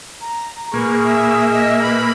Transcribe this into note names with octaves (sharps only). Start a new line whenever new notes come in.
A#5
A#2 A#3 G#4 B4 C#6
E5 D#6
D#5 E5
B4 B5